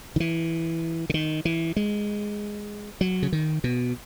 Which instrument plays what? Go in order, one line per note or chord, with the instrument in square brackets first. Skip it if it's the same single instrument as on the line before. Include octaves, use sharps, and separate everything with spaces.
[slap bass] D#3
E3
C#3
D#3
E3
G#3
F#3
C#3
D#3
B2